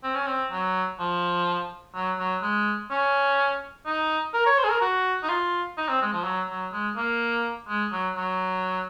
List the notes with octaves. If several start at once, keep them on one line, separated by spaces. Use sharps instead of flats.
C4
C#4
C4
F#3
F3
F#3
F#3
G#3
C#4
D#4
A#4
C#5
C5
G#4
A#4
F#4
D#4
F4
D#4
C4
G#3
F3
F#3
F#3
G#3
A#3
G#3
F#3
F#3